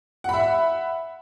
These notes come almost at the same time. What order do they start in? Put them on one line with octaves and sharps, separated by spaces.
F#5 B5 E5